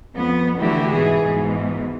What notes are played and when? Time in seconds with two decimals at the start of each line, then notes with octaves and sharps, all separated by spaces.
0.15 F2 B3
0.57 D3 E3 A3 E4 F#4 G4
0.91 G#2 B2 E3 G#4
1.24 G#2 B2 E3